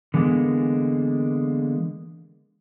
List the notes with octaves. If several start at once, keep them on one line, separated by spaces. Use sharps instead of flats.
D3 E3 G#3 A#3 B3